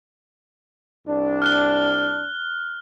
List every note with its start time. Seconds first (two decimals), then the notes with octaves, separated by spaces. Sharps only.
1.08 C2 D4
1.42 F6 F#6 G7